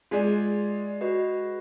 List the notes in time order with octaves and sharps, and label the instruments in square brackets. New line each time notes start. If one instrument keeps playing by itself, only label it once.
[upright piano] G#3 [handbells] F4 G#4 D5 G#5
[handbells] F#4 B4 D#5